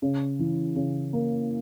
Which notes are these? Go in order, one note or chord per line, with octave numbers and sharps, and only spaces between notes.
C#3
E3
C#3
A#3